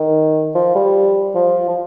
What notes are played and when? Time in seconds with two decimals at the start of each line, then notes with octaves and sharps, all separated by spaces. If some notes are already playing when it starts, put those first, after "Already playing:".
Already playing: D#3
0.55 F3
0.75 G3
1.35 F3
1.69 F3